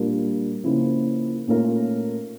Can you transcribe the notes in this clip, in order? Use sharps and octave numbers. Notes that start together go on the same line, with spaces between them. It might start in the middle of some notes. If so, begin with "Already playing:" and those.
Already playing: A#2 G3 D4 F4 A#4
C#2 C#3 F3 A#3 E4
A#2 A3 C#4 F4 A#4